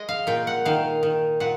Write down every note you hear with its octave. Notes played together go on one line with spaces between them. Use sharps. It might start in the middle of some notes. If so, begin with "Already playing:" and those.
Already playing: G#3 D#5
F5
A#2 G5
F#5
D#3 F5
D#3
A#2 F#5